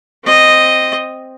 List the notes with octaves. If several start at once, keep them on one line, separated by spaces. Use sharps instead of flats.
C4 D#5